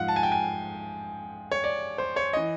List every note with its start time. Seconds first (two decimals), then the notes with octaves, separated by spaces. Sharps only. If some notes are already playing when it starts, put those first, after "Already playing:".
Already playing: G#2 F3 F5 F#5
0.08 A5
0.16 G#5
0.23 G5
0.32 G#5
1.52 C#5
1.64 D5
1.98 C5
2.16 C#5
2.33 E3 D#5